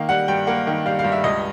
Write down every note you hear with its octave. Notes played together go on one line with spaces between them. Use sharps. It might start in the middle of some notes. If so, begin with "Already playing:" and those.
Already playing: D#3 A#3 F5
G3 F#5
G2 G5
A#3 F#5
D#3
G3 F5
F5
G2
E5
C#2 D#5